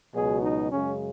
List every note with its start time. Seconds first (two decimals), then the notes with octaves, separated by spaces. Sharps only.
0.14 C#2 B2 F#3 G#4
0.42 D#4
0.72 F#2 C#3 G#3 C#4